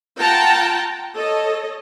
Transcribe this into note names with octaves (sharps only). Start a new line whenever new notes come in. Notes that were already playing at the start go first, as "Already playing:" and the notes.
F4 F#5 G5 A5 A#5
A4 C#5 D#5